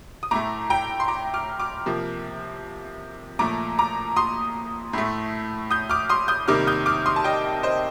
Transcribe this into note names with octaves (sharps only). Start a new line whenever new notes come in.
D#6
A2 A3 A#5 D6
G5 A#5
C6
A#5 D6
D6 F6
D6 F6
C3 F3 A#3
A#2 F3 A3 A#5 D6
A#5 D6
C6 D#6
A2 A3
D#6 G6
D6 F6
C6 D#6
D#6 G6
C3 D#3 G3 A#3 D6 F6
D#6 G6
D6 F6
C6 D#6
A5
D#5 G5
C5 D#5